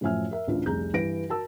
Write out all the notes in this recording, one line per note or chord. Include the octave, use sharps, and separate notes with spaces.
F#2 A2 F3 E5 G#5 F6
A#4 E5
A1 D2 E3 D4 F4
F1 C2 G#4 A#5 G6
G2 E3 B4 A#6 D7
F#4 A#4 A5 E6